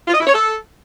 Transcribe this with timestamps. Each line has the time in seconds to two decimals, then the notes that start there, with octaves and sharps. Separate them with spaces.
0.08 F4
0.14 D#5
0.21 E4
0.27 C#5
0.34 A4